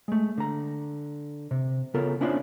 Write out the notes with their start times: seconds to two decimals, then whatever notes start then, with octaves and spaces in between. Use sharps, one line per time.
0.08 G#3 A3
0.38 D3 A#5
1.51 C3
1.94 C#3 B3 F4 A4 A#4
2.21 C#4 D4 E4 F4 C5 D5